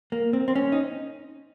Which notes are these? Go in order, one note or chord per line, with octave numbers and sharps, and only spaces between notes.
A#3
C4
C4
C#4
D#4